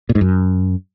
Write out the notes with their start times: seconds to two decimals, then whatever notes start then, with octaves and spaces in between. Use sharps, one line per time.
0.09 A#2
0.15 G#2
0.21 F#2